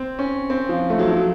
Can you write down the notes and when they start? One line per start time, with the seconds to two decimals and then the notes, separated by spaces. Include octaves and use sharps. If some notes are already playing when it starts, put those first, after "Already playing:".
Already playing: C4
0.19 C#4
0.50 C4
0.69 F3
0.90 A3
0.99 F#3
1.08 F3
1.17 F#3